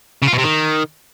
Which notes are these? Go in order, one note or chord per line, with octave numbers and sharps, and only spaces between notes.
C#3
F4
B2
C3
D#3